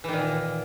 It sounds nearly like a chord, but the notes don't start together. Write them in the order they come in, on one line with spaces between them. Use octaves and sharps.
E3 D#3 A#2